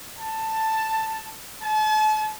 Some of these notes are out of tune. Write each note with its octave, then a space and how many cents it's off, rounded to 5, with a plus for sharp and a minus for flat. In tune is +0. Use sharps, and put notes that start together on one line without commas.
A5 +10
A5 -40